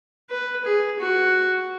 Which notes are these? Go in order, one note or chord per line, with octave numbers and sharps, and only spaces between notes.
B4
G#4
F#4